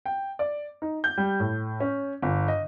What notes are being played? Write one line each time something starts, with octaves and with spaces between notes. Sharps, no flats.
G5
D5
D#4
G6
G3
A2
C#4
G1
D#5